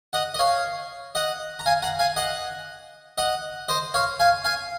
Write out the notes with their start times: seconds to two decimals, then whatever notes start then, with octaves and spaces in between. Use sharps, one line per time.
0.13 D#5 F#5
0.34 D#5
0.39 C#5 F5
1.15 D#5 F#5
1.59 A#5
1.66 F5 G#5
1.82 F#5 A#5
1.99 F5 G#5
2.16 D#5 F#5
3.18 D#5 F#5
3.68 C5 D#5
3.94 C#5 F5
4.20 F5 G#5
4.44 F5 G#5